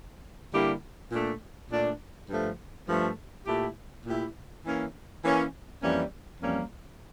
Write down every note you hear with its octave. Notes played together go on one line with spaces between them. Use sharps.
D3 G3 A#3 E4 G4
A#2 A3 D4
A#2 A3 D4
G2 F3 A3
G2 F3 A3
A#2 A3 E4 G4
A#2 A3 E4 G4
E3 A#3 C#4
E3 A#3 C#4
F2 E3 G3 A#3 C#4
F2 E3 G3 A#3 C#4